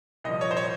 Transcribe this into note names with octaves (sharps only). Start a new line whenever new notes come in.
C2 A#2 F3 D#5
C#5
C5
C#5